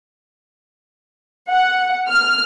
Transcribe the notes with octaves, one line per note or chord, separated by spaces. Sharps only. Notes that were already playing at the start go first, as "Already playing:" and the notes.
F#5
F6